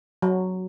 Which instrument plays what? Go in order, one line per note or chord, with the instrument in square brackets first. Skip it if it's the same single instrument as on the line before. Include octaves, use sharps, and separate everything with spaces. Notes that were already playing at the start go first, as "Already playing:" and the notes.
[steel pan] F#3